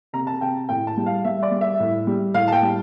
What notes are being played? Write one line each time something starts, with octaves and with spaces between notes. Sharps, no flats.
C3 A#5
A5
C3 G5
A2 G5
A5
G3
F5
G3 E5
D5
G3
E5
A2
G3
A2 F5
A5
G5
G3